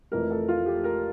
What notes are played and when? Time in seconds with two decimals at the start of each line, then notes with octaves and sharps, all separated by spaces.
0.12 F1 F2 E3 A3 A#4
0.30 A4
0.48 F4
0.66 G4
0.84 A#4